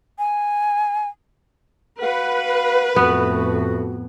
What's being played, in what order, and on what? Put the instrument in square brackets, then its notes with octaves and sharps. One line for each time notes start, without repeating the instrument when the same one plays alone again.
[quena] G#5
[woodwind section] F#4 F5 F#5 [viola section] B4
[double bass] F2 A2 [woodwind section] A3 F#4 [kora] B3